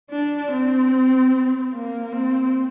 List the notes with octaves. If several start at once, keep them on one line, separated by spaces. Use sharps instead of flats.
D4
C4
A#3
C4